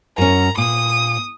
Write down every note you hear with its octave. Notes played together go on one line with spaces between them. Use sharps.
F#2 C#4 A#5
A#2 D#6